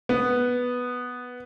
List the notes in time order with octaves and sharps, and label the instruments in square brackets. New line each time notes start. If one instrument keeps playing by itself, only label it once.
[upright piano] B3